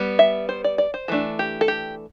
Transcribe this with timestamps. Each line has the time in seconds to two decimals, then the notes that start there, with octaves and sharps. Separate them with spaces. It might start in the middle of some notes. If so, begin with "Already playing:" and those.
Already playing: G3 B3
0.19 E5
0.49 C5
0.64 D5
0.78 D5
0.94 C5
1.08 E3 A3 D4 A4
1.39 G4
1.61 A4
1.68 G4